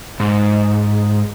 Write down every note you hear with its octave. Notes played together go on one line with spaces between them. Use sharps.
G#2